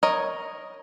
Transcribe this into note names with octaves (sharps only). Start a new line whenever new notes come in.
A#4 C#5 D#5